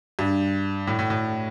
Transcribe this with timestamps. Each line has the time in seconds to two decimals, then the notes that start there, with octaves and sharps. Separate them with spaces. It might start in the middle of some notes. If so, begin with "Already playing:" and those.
0.19 G2
0.87 A2
0.99 A2
1.10 A2